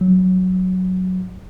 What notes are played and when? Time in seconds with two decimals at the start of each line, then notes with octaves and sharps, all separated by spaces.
0.01 F#3